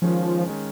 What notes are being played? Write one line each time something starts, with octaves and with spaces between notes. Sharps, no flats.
D#3 F3 G#3 C#4
D#3 G#3 C#4